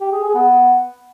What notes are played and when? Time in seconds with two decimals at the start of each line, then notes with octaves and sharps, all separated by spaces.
0.01 G4
0.12 G#4
0.24 G#4
0.35 B3